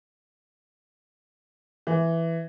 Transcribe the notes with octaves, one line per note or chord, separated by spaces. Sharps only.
E3